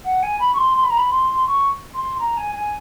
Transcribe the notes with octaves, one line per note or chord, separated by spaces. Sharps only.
F#5
G#5
B5
C#6
C6
C6
B5
A#5
B5
C6
C#6
C6
A#5
G#5
G#5